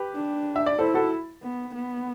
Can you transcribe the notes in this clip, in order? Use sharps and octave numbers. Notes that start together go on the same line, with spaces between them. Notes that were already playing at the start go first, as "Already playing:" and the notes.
Already playing: G4 B4
D4
E5
D5
E4 A4 C5
F#4 A4
B3
B3